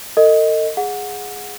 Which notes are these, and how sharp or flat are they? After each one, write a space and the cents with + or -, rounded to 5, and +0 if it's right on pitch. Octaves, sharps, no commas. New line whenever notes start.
A4 +45 D#5 +0
G#4 +0 F#5 -20